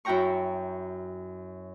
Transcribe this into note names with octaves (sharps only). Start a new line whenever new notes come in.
F#2 E4 F#4 G5 A#5 C#6